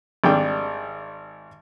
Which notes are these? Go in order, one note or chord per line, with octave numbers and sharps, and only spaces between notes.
G#1 G3 D4 G5